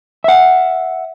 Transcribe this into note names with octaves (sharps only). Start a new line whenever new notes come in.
E5 F#5